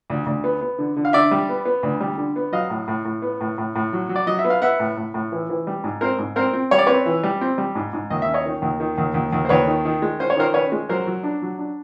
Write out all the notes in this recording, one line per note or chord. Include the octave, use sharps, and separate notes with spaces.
D2
D2
B3
B3
D3
D3
F5
D3 D5 E5
G3
B3
B3
D2
G3
D3
B3
F#3 D#5 F5
A2
A2
A2
B3
A2
A2
A2
F#3
F#3
D5
F#3 D#5
E5
B3
F5
B3 E5 F#5
A2
A2
A2
E3
E3
G3
G#2
C4 A#4 C5
G#2
C4 A#4 C5
C4
G3 C#5
D5
C4 B4 C#5
E3
G3
C4
G3
G#2
G#2
D#2 D#5
E5
C#4
C#5 D#5
D#3
D#2
D#3
D#2
D#2
D#2
C5
D#2 B4 C#5
D#3
D#3
G#3
C#4 C5
C#5
D#3 A#4 C5
C#4 B4 C#5
G#3
F#3 A#4 C5
F#3
D4
F#3
D4